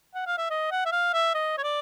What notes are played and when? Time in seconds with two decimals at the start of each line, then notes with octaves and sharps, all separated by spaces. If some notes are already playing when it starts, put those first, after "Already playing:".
0.14 F#5
0.26 F5
0.38 E5
0.50 D#5
0.71 F#5
0.85 E5
0.92 F5
1.13 E5
1.34 D#5
1.58 C#5
1.63 D5